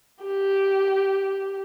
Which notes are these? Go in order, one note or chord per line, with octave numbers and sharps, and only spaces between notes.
G4